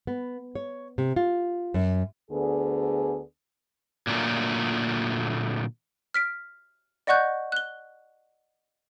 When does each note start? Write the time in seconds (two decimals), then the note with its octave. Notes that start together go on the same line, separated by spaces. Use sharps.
0.07 B3
0.55 C#5
0.98 C3
1.16 F4
1.74 F#2
2.31 D2 D3 B3 G#4
4.07 A#2 D3 F#3 A3 A#3
6.14 F6 B6 D7
7.07 D5 D#5 F#5 C#6 F#6 G6
7.52 F#6 G7